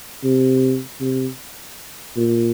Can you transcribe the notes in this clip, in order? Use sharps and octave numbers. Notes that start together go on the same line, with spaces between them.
C3
C3
A#2